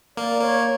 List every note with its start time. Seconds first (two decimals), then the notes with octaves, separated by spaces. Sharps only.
0.17 A#3 D5
0.40 A#3 C#5